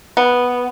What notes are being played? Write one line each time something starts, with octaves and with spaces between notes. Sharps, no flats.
B3